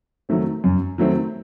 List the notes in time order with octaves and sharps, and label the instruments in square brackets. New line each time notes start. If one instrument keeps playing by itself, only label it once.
[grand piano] D#3 F#3 A3 C4
F#2
D#3 F#3 A3 C4